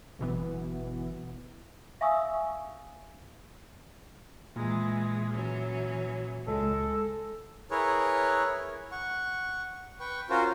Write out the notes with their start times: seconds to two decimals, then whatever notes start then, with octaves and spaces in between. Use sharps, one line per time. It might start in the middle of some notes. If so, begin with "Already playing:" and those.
0.19 G1 B2 E3 B3
2.01 E5 F5 G#5 C#6 D#6 E6
4.56 A#2 E3 G#3
5.32 E3 F#3 C#4
6.48 C#2 G#3 A4
7.71 E4 G#4 A#4 B4 C#5
8.91 F#5 C#6
10.00 B4 G5 C#6
10.30 C#4 F4 F#4 A#4 C5